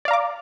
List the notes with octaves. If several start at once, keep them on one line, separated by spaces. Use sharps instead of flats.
D5 F5 A#5 D6